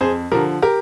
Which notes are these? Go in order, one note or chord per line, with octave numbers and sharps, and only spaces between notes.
F2 G#4 C5
D3 F3 G4 A#4
G4 A#4